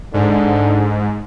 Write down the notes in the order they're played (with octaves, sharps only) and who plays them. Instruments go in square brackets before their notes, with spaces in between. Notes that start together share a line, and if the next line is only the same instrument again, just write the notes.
[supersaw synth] G#2 [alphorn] D3